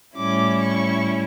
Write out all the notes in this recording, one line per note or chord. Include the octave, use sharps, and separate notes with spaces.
A2 G3 C#4 E4 D6
C#6